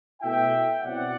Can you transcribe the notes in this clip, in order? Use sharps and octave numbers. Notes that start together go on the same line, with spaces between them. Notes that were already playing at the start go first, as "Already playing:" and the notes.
B2 A3 E4 E5 G5
B2 F#3 C4 E4 D5 F#5